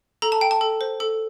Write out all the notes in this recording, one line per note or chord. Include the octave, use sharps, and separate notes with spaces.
A4 A#5
A5
G5
A5
A4
C5
A4